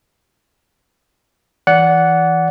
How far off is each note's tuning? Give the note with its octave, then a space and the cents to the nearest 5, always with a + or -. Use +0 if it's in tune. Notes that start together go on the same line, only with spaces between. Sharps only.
E3 +0 D5 -30 F#5 +0